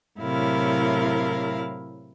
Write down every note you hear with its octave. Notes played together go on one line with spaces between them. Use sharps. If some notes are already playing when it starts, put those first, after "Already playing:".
A2 C3 F#3 E4 A#4 F5